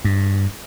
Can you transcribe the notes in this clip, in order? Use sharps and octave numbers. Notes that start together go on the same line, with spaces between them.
G2